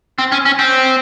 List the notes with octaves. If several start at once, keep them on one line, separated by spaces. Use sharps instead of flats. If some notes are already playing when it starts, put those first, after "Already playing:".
C4
C#4
C#4
C4